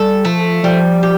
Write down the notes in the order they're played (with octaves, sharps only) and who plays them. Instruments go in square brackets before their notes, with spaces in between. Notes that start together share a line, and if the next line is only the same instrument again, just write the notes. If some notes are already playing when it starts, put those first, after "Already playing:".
Already playing: [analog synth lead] G3 [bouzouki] A4
[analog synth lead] F3 [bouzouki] A3
[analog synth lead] F3 [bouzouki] G3
[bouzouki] G4